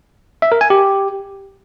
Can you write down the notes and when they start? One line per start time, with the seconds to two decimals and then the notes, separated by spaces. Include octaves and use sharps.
0.42 E5
0.52 A#4
0.61 G#5
0.70 G4